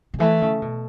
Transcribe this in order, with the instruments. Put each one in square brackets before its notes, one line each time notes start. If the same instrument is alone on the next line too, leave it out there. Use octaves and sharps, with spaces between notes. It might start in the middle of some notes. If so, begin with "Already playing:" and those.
[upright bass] C#3
[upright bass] E3 [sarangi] A3
[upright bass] C#3
B2